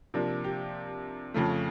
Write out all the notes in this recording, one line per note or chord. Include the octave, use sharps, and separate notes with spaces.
C3 F3 A#3 D4
G4
F2 C#3 F3 A3